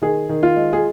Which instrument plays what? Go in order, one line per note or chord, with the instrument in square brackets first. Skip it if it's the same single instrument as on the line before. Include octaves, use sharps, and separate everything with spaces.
[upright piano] D#3 G#4
D#3
F4
G#3
G#4